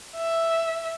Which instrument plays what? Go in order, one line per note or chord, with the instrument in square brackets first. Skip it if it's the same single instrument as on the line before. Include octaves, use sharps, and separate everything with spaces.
[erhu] E5